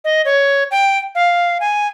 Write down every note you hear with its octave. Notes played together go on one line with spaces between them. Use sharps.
D#5
C#5
G5
F5
G#5